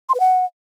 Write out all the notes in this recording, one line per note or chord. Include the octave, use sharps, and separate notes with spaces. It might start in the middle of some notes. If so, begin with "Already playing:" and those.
C6
B4
F#5